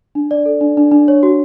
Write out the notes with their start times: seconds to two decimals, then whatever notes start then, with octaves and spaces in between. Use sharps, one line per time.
0.15 D4
0.31 D5
0.46 A4
0.61 D4
0.77 D4
0.91 D4
1.08 C#5
1.23 F#4